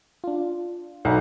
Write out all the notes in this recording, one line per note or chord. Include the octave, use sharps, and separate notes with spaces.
D4 F4
B1 F#4 D5